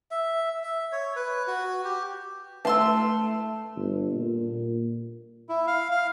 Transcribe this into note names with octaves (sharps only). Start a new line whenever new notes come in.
E5
E5
C#5
B4
F#4
G4
A3 F5 A5 C6 E6
G1
A#2
E4
F5
F5